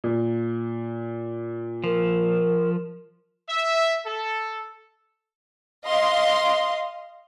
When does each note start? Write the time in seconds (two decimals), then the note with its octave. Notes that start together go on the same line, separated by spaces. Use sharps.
0.04 A#2
1.84 F3 A#4
3.49 E5
4.06 A4
5.85 D#5 F5 C6